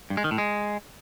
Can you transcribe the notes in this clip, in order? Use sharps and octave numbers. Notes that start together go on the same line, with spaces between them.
G2
G#3
D#3
A2
G#3